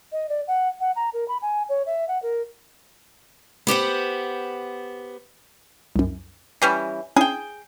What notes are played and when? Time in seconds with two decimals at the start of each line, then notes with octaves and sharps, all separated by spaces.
0.12 D#5
0.29 D5
0.48 F#5
0.80 F#5
0.96 A#5
1.13 A#4
1.28 B5
1.42 G#5
1.69 C#5
1.86 E5
2.08 F#5
2.23 A#4
3.67 B3 G4 C5 F#5
5.96 C2 F#2
6.62 E3 G3 C#4 C7
7.16 C#4 D4 E4 G#4 G5